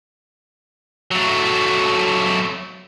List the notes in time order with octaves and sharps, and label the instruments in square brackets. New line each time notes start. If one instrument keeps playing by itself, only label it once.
[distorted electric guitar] F#3 A3